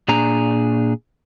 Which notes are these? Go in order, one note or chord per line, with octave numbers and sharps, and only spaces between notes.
A#2 D4 G#4 A#5